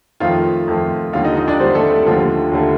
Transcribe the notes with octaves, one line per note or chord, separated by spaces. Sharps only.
F2 D#3 A3 F4 F5
F2 D#3 A3
D#2 D3 G3 F4 F5
D#4 D#5
D#4 D#5
D4 D5
D#2 D3 G3 C4 C5
A3 A4
A3 A4
D#2 D3 F3 A3 F4
D#2 D3 A3